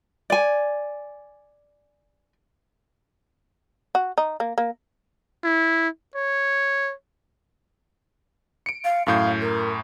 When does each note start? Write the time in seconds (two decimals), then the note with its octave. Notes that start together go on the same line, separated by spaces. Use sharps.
0.30 D5 G#5
3.95 F#4
4.18 D#4
4.40 A#3
4.58 A#3
5.44 E4
6.15 C#5
8.66 C#7 D7
8.84 F5
9.07 F#2 A2 F5 G6
9.41 A#4